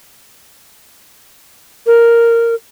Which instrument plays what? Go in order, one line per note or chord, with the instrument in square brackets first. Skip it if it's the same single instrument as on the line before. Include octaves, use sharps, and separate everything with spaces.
[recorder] A#4